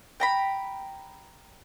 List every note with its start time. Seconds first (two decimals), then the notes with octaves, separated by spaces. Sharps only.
0.20 G5 A#5 B5